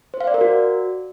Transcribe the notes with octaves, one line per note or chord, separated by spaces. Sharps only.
C5
F5
D5
A#4
F#4